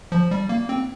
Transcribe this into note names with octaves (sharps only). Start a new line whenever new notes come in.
F3
G3
A#3
C4